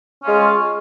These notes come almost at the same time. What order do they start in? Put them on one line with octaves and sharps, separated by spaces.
C#4 F4 G#3